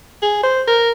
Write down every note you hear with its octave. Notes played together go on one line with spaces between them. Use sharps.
G#4
C5
A#4